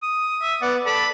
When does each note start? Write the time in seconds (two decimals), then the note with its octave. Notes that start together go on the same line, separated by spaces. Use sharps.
0.02 D#6
0.42 E5
0.62 B3 D5 F#5
0.86 A4 D5 A5 B5